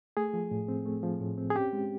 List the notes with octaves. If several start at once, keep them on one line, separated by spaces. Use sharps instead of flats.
A3 G#4
F3
A2
C4
A3
F3
A2
C4
G#4
C#4 G4
G#3